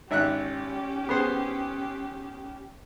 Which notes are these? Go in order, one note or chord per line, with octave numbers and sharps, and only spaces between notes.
G#1 C#4 G4 E5 F#6
B3 G#4 C5